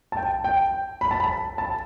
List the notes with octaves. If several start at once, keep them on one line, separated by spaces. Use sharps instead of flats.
A5
G5
G5
B5
A5
B5
A5